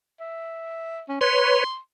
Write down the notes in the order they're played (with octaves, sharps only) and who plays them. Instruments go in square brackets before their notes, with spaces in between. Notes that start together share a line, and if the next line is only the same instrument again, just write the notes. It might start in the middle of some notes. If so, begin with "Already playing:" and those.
[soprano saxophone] E5
C#4
[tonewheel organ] B4 C#5 [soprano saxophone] C6